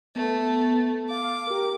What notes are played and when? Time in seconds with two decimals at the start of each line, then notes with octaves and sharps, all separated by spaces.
0.16 A3 B3
1.10 F5 D6
1.47 G4 A#4